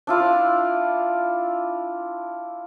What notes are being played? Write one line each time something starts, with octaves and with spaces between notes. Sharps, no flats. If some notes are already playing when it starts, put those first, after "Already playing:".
D4 E4 F4 D5